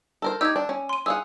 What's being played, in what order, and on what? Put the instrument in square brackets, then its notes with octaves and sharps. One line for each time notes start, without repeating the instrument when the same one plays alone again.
[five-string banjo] A4 A#4 C5
[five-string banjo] D#4 G4 [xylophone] E6 G#6
[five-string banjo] D4
C#4
[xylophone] C6 D#7
[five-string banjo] G#4 F5 F#5 [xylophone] E6